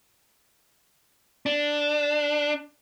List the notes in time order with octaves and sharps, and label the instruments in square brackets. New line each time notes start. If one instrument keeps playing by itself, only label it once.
[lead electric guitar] D4